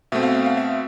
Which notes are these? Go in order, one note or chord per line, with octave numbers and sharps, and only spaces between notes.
B2 A3 C4 E5
F5
E5
F5
E5